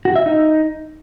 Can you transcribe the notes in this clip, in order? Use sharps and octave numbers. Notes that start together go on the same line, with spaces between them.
F#4
E5
D#4